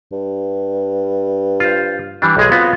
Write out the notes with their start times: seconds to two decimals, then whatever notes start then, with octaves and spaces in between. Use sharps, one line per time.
0.12 G2
1.60 F4 C5
2.22 E3 G3 D4
2.37 B1 G#3 G#4
2.52 B3 C4 F4 F#4